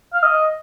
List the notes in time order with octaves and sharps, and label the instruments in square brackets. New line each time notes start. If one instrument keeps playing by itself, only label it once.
[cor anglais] F5
D#5